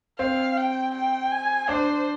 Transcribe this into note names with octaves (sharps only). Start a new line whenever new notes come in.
C4 F5
G5
G5
G#5
D4 C5